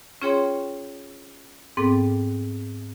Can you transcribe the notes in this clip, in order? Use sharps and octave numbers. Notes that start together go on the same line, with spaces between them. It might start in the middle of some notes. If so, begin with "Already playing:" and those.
C#4 F4 G#4 C#5 G5 C6
G#2 B3 C4 A4 G5 D6